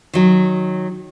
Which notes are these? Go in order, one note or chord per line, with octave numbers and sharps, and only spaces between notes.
D#3 F#3